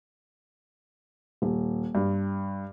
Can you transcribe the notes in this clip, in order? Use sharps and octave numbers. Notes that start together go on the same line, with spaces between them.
D#1
G2